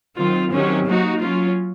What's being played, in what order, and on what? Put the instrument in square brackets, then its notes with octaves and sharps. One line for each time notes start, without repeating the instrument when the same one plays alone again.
[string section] D#3 F#3 C4 F4
C3 D#3 F#3 C#4
F#3 A#3 D#4 F#4
F#3 C#4 F4